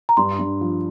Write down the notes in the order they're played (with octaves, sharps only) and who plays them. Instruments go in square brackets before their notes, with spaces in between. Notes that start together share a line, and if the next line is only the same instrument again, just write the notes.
[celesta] A#5
[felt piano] G2 [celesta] C6
[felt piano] G2
F3